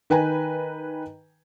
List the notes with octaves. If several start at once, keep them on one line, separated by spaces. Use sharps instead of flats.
D#3 B4 G5 G#5 A#5